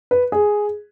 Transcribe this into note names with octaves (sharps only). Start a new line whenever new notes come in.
B4
G#4